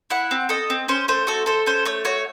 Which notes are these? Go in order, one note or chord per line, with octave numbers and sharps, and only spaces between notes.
E4 F#5
C4
A4 D#5
C4
C#4 C5
A3 C5
F#4 A4
A4 C5
C#4 C5
A3 C#5
F#4 C#5